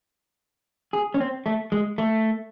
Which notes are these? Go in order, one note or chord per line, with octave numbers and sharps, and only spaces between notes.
G#4
C#4
C4
A3
G#3
A3